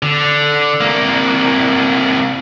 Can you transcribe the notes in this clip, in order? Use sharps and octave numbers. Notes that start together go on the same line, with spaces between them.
D3
C2 A#3